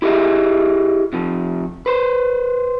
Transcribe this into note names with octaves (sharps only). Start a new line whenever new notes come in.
E4 G4 G#4 D#5 E5
C3 F3
B4 C5